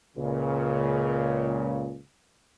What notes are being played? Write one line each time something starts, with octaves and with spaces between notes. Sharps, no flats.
C#2 A#2 C#3